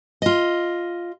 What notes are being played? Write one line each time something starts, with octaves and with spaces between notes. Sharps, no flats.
F4 D#5